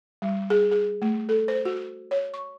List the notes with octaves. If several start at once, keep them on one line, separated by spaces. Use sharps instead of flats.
G3
G#4
G#4
A3
A4
C5
F#4
C#5
C#6